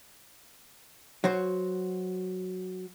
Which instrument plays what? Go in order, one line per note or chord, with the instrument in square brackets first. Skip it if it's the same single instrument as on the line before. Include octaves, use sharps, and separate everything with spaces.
[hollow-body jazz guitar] F#3 F#4 C5